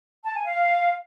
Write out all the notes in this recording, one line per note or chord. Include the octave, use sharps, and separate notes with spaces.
A5
G#5
F5